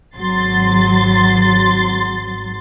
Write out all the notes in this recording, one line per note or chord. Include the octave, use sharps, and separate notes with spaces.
G#1 F#3 C6 A6